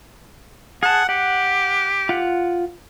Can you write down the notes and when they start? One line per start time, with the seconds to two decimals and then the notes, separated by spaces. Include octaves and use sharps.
0.83 G#4 F#5 A5
1.09 G4 F#5
2.09 F4 F#5